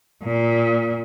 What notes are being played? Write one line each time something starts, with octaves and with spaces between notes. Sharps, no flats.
A#2